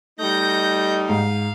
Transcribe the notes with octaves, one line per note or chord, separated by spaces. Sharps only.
G3 A3 D#4 G6 A#6
G#2 F5